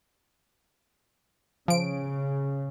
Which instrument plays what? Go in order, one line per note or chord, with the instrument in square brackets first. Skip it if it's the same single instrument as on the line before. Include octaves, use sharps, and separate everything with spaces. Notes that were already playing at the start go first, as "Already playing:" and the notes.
[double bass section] C#3 [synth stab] F3 D7